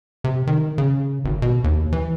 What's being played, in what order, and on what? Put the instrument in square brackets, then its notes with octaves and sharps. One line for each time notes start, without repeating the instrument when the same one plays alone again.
[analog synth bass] C3
D#3
C#3
G#1
B2
D#2
E3